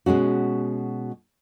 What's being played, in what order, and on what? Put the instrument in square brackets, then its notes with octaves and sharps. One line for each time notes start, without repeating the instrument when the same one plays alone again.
[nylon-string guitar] B2 G#3 C#4 F#4